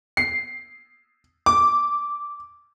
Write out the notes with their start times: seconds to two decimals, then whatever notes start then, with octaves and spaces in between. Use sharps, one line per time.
0.17 C7
1.46 D6